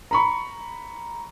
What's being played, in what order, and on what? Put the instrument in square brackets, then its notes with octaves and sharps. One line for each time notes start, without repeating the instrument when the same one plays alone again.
[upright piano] A#5 B5 C#6